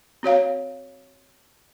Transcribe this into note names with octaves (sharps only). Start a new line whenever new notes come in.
C4 F#4 C#5 F5